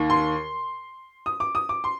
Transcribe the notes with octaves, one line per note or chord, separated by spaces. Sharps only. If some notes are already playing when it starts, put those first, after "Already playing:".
Already playing: D#2 D#3
C6
D#6
D6
D#6
D6
C6